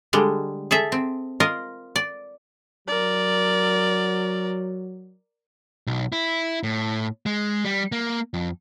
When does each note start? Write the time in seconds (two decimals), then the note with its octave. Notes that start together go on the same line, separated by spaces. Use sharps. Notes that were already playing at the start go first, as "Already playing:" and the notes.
0.13 D3 G3 G#3
0.71 G#4 A4 E5
0.92 C4
1.40 F4 A#4 D#5
1.96 D5
2.87 F#3 A#4 D5
5.87 B1
6.12 E4
6.63 A2
7.26 G#3
7.65 G3
7.92 A#3
8.34 F2